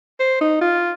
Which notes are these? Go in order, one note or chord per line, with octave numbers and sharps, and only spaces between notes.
C5
D#4
F4